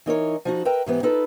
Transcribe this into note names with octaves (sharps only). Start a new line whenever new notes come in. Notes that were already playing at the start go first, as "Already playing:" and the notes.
E3 D#4 A#4 C#5
F3 D#4 F#4
A#4 B4 E5 G5 A#5
G#2 E3 B3 G4
D#4 F4 A4 B4